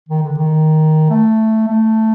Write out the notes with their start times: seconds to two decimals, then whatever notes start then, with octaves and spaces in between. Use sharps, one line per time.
0.09 D#3
0.23 D3
0.38 D#3
1.10 A3
1.67 A3